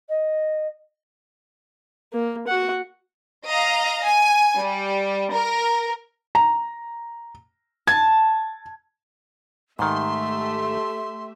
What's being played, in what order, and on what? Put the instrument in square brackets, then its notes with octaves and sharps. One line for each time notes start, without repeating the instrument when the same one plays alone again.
[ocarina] D#5
[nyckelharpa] A#3
F#4 F#5
[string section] D#5 F5 A#5
G#5
G3
A#4
[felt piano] A#5
[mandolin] A5 [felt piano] G#6
[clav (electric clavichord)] G#2 D#3 [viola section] A3 G4 E5 [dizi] C6